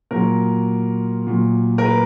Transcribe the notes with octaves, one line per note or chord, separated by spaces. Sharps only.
A#2 F#3 A#4
A#2 F#3
A#4
B4